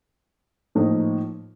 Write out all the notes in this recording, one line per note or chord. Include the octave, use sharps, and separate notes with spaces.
A2 F3 A#3 D#4